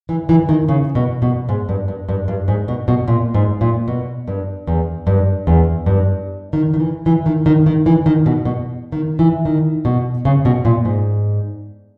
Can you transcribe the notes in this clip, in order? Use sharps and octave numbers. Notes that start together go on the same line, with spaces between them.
E3
E3
D#3
C#3
B2
B2
G#2
G2
G2
G2
G2
G#2
B2
B2
A#2
G#2
A#2
B2
G2
E2
G2
E2
G2
D#3
D#3
E3
E3
D#3
D#3
D#3
E3
D#3
B2
B2
D#3
E3
D#3
B2
C#3
B2
A#2
G#2